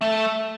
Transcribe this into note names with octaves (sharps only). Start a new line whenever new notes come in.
A3